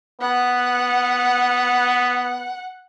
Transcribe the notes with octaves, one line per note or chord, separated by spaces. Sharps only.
B3 F#5